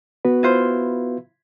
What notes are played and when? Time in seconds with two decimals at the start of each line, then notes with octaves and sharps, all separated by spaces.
0.25 B3 F#4 B4
0.43 E4 F4 C5